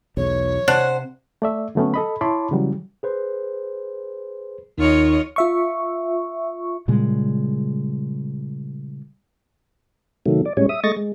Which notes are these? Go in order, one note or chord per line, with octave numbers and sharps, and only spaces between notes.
B1 E2 C#5
C3 D4 C5 F#5
A3 D5 E5
D3 F#3 A3 B3 C#4
A4 D#5 B5
E4 C#5 A5 B5 C6 D6
C#3 E3 F#3 G3
G#4 B4 C5
D#2 D#3 F4 C#5 D#5
F4 E5 C#6
A#2 C#3 G3 G#3
C3 D#3 F#3 A3
D5
A2 G3 G#3 C#4 C#5
E5 D#6
G#3 A3 D#5 C#6 A6 A#6
G#3